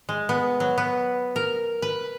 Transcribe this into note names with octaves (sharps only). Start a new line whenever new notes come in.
G#3
B3
F#3
B3
A#4
B4